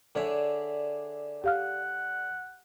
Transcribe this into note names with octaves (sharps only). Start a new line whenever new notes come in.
D3 G#4 C#5 D5 E5
G4 F5 F#5 F6